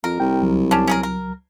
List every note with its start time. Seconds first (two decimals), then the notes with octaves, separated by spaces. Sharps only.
0.04 F2 A#4
0.20 C2 G5
0.42 C#2 F#3
0.71 C#4 D4
0.87 C#4 G#4 A#4
1.03 A#4